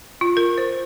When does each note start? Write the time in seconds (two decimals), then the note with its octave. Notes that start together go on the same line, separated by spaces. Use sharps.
0.21 F4
0.37 A#4
0.58 C5